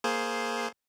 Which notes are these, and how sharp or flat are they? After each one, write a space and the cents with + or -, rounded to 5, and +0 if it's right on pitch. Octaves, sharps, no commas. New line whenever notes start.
A#3 +0 G#4 +10 C5 +0